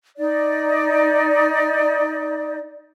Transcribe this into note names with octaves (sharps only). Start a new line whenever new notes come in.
D#4 D5